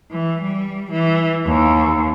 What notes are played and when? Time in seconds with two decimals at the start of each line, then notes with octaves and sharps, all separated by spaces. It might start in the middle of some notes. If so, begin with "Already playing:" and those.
0.10 E3
0.42 G3
0.91 E3
1.45 D#2